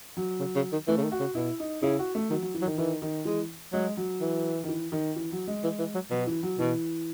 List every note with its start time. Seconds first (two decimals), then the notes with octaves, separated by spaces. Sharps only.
0.17 F#3
0.40 C#3
0.56 C#3
0.72 D#3
0.88 E3 A3
0.98 C#3
1.03 D#3
1.12 F#4
1.20 C#3
1.35 B2 E4
1.60 D#4
1.82 C#3 E4
1.99 F#4
2.15 A3
2.31 D#3 F#3
2.42 F#3
2.54 E3
2.62 F#3
2.66 D#3
2.78 D#3 E3
3.02 D#3
3.25 E3 G#3
3.73 F#3 G#3
3.97 F#3
4.21 E3
4.63 D#3
4.68 E3
4.92 D#3
5.16 E3
5.32 F#3
5.47 G#3
5.64 E3
5.79 E3
5.95 F#3
6.11 B2 F#3
6.27 E3
6.43 F#3
6.59 B2 E3